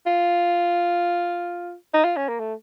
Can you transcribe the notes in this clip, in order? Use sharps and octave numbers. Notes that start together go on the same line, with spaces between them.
F4
D#4
F4
C#4
A#3
A3